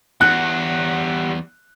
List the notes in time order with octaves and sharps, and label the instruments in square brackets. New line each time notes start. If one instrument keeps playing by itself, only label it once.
[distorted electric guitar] E2 [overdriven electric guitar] G3 F#5 [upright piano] F#6